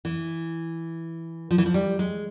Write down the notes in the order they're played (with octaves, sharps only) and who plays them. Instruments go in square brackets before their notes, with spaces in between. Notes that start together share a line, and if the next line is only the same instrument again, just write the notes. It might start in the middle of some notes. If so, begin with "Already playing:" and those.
[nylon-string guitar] E3
F3
E3
F3
G3
G#3